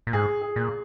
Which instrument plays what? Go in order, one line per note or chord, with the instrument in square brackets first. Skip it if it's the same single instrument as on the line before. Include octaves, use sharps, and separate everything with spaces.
[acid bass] A#2
[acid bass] G#2 [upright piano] G#4
[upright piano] G#4
[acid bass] A#2